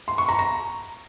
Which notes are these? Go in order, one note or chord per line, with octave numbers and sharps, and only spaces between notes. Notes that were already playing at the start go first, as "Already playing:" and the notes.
C6
C#6
A#5
A#5